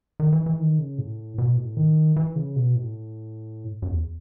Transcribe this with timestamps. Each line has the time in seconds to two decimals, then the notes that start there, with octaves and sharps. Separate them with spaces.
0.20 D#3
0.33 E3
0.46 E3
0.60 D#3
0.79 C#3
0.98 A2
1.38 B2
1.57 A2
1.77 D#3
2.16 E3
2.36 C#3
2.56 B2
2.76 A2
3.82 F#2
3.87 E2